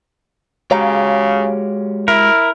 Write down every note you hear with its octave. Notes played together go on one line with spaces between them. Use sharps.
C#3 G#3 F#4 G4 C#5 F5 A#5
E4 A#4